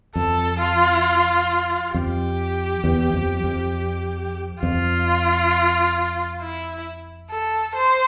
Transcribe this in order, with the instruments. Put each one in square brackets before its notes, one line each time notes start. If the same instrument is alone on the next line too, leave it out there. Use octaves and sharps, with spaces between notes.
[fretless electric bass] F2 [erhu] A4
[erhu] F4
[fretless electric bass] F2 [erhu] G4
[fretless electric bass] E2
F2
F2
[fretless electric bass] F2 [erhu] F4
[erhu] E4
A4
C5